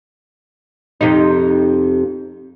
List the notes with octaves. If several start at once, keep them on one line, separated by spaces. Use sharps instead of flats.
F2 C3 D#4